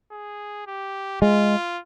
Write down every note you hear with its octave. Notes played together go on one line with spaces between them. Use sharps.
G#4
G4
G#3 F4